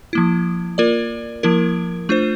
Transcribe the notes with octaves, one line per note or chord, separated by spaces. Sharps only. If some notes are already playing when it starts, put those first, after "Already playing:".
F3 A#3 E4
A#3 F4 A#4 D5
F3 A#3 E4 A#4
A3 D4 F4 C5